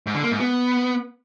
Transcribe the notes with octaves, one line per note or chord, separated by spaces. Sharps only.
G#2
D3
A#3
G#2
B3